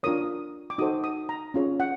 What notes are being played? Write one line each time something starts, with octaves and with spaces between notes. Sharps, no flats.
D4 F4 A#4 C#5 D#6
D6
D#4 F#4 A4 C5 D#6
D#6
A#5
C#4 F4 G#4 C#5
F#5